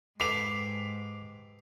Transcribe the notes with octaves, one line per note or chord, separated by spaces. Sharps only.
G#2 G4 A4 B4 D6 B6 C7 F7